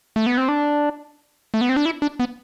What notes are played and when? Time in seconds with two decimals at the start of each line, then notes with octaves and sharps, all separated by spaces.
0.16 A3
0.26 B3
0.37 C4
0.48 D4
1.54 A3
1.61 B3
1.69 C4
1.77 D4
1.86 E4
2.02 D4
2.20 B3